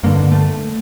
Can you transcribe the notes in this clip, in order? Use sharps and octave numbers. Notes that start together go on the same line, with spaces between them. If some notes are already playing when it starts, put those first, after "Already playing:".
G2 D3 A#3
A3